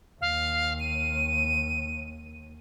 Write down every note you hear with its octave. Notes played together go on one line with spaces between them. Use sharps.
D#2 F5
D#7